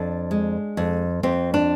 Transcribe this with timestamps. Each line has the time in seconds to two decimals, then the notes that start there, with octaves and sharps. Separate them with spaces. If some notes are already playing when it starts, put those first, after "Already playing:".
Already playing: F2 D4
0.31 G#3
0.77 F2
1.23 F2 C4
1.54 D4